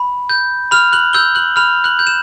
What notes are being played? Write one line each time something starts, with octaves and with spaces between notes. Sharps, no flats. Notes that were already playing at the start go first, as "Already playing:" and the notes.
Already playing: B5
G6
B5 F6 F7
F#6 F#7
E6 G6 G7
F#6 F#7
B5 F6 F7
F#6 F#7
G6
E7